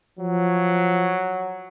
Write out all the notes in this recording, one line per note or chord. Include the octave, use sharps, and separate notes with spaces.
F3 F#3